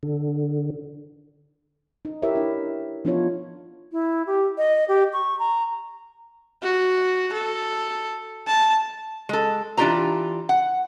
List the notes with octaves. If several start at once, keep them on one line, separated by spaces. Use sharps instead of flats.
D3
D#4
E4 G4 A#4 B4 C#5 E5
D4 E4
F3 B3 D4 D#4 F4 C#5
E4
G4
D#5
G4
C#6
A#5
F#4
A4
A5
G#3 A4
E3 D4 F4 G4 C5 A#5
F#5